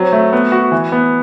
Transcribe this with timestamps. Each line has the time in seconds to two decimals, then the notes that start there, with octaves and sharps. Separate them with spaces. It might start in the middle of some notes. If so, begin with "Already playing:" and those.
Already playing: F#3 C4
0.13 A3
0.33 B3
0.52 F#4
0.72 E3
0.92 B3